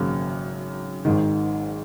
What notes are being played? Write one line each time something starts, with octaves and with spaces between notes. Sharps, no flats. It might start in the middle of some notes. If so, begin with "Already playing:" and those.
Already playing: G#1 F#2 C#3 F#3 A#3
G#1 G#2 D#3